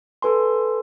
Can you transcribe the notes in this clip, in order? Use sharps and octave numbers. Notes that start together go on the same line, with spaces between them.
A4 B4 G#5 C6